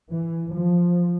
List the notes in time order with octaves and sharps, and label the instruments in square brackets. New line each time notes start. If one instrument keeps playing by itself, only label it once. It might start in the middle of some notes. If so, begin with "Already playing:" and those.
[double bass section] E3
F3